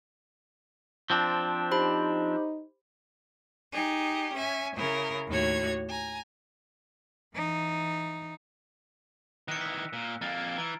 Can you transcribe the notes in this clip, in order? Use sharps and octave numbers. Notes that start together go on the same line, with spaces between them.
F3 C4 D4
D#4 G4 C5 B5
D#4 G4 G#4
C#4 E5 G#5
C#3 E4 A#4
D#2 A2 F#4 C#5 G#6
G#5 A#5
E3 D#4
D#3 E3 F#6 A#6 C#7
E6 B6
A#2
F2 A#3 A#5 F6 A6
G#6
E3 A#5 D7